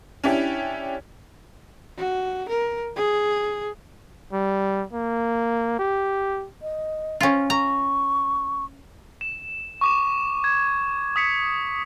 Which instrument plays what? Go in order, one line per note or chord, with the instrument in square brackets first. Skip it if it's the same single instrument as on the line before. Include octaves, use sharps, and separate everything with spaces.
[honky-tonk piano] C#4 D4 E4 G4
[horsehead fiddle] F#4
A#4
G#4
[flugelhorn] G3
A#3
G4
[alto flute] D#5
[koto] C#4 F4
[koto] A#5 [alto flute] C#6
[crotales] E7
C#6 D6 E7
G#6
D#6 B6 C#7